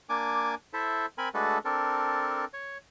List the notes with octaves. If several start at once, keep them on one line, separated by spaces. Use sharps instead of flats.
A#3 D4 G#5 D6
E4 A4 C5 E5
C4 A#4 G#5 B5
G#3 A3 D4 F#4 A4 B4
C4 D4 A4 A#4
C#5